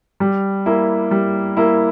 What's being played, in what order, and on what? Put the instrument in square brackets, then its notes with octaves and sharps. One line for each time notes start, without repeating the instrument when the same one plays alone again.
[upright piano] G3
A#3 E4
G3
A#3 E4